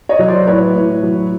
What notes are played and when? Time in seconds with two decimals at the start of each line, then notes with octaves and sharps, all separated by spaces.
0.09 C#5 D#5
0.19 F#3
0.28 C5 D5
0.47 A2 B4 C#5
0.75 A2
1.03 F#3